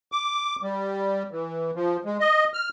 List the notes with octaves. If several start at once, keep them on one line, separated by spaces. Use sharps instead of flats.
D6
G3
E3
F3
G#3
D#5
F6